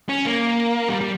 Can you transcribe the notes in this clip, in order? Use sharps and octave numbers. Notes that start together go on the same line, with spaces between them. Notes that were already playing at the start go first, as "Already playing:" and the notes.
C#4
A#3
G3
G3